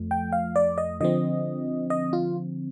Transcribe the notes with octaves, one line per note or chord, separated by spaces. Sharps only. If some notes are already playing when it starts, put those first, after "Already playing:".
Already playing: F2 F3 A3
G5
F5
D5
D#5
D3 F3 C4 D#5
D#5
F4